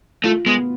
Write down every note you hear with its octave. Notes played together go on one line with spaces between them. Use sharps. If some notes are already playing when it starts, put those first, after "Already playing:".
A3 F4
G#3 B3